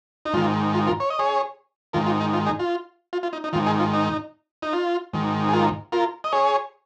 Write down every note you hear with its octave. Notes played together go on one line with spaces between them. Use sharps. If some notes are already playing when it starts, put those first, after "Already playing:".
D#4
G#2 D#3 F4
F4
F4 A#4
C#5
D#5
G#4 C#5
G#2 D#3 F4 A#4
F4
D#4
F4
D#4 G#4
F4
F4
F4
D#4
D#4
G#2 D#3 F4
D#4 G#4
F4
D#4
D#4
F4
G#2 D#3
G#4
F4 A#4
F4 A#4
D#5
G#4 C#5